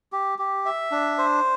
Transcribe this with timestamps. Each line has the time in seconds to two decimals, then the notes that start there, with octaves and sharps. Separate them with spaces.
0.12 G4
0.39 G4
0.65 E5
0.91 D4
1.18 C5